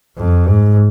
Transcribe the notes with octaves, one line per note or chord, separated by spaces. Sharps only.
F2
G#2